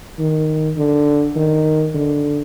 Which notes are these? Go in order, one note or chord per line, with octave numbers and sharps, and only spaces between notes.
D#3
D3
D#3
D3